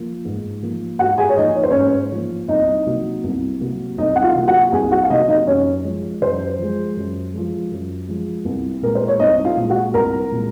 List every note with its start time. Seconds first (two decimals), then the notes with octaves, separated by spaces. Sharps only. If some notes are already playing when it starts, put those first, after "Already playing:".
Already playing: F3 A#3
0.25 G#2
0.63 F3 A#3
0.99 G#2 F#4 F#5
1.18 G#4 G#5
1.29 C#5
1.37 F3 A#3 D#4 D#5
1.55 C#5
1.63 C5
1.71 G#2 C#4 C#5
2.12 F3 A#3
2.48 C2 D#4 D#5
2.86 C3 F#3 A#3
3.24 C2
3.60 C3 F#3 A#3
3.97 C2 D#4 D#5
4.16 F#5
4.23 F4 F5
4.35 C3 F#3 A#3
4.47 F#4 F#5
4.72 C2 G#4 G#5
4.91 F#4 F#5
5.03 F5
5.10 C3 F#3 A#3 D#4 D#5
5.28 D#4 D#5
5.46 F#2 C#4 C#5
5.84 F3 G#3
6.22 F#2 C5
6.59 F3 G#3
6.96 F#2
7.34 F3 G#3
7.71 F#2
8.08 F3 G#3
8.45 C2
8.82 A#2 G#3 A#4
8.95 C5
9.08 C#5
9.19 C2 D#4 D#5
9.45 F4 F5
9.57 A#2 G#3
9.70 F#4 F#5
9.94 C2 A#4 A#5
10.32 A#2 G#3